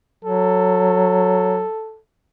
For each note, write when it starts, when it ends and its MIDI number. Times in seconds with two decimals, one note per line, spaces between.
0.24 1.64 54
0.24 2.00 69